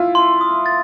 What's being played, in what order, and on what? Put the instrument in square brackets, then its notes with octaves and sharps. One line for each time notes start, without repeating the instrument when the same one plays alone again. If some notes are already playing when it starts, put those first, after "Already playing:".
Already playing: [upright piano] E4 F4
[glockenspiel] C6
D#6
A6